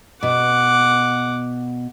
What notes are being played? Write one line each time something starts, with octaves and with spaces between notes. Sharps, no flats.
B2 F#5 D6